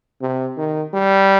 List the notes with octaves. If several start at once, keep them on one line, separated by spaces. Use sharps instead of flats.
C3
D#3
G3